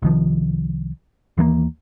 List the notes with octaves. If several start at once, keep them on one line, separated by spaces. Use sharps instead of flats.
C2 D#3 F3
D#2 E3 G#3 A#3